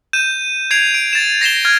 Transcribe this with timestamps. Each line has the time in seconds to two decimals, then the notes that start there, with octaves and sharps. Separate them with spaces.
0.13 G6 D#7 E7
0.71 G#6 C7 D7 F7
0.94 D7
1.13 A6 E7
1.41 A#6 C7 E7 G7
1.65 F6 G#6